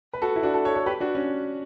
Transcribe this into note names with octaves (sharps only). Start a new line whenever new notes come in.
B4
F#4 A4
E4
D4 F#4
F#4 A4
A4 C#5
A4 C#5
G4 B4
D4 F#4
C#4